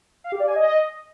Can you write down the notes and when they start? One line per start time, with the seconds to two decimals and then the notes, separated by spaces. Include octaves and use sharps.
0.24 F5
0.32 G4
0.40 D5
0.48 G#5
0.55 D#5